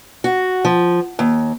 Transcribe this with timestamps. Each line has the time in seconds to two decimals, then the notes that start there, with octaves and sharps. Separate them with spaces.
0.24 F#4
0.65 F3
1.19 D#2